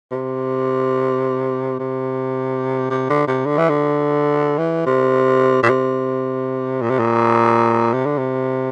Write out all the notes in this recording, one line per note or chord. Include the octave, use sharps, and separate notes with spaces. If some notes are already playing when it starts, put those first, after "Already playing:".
C3
C3
C3
D3
C3
D3
E3
D3
E3
C3
A#2
C3
A#2
C3
A#2
C3
D3
C3